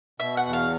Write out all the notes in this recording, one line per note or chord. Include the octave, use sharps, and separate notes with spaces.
B2 E5
F#5
E2
F5